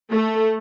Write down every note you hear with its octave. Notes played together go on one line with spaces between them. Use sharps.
A3